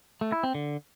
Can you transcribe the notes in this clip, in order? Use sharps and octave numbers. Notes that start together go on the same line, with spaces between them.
A3
E4
C4
D3